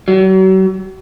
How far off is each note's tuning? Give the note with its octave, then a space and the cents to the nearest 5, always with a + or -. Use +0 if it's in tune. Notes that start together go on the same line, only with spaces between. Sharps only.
F#3 +40